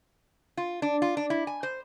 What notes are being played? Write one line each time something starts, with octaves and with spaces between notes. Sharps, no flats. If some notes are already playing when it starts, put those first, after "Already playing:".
F4
D4
F4
D4
E4
G#5
C5